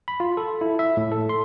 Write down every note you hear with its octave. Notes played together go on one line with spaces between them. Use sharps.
B5
F4
A4
E4
E5
A2
A4
C6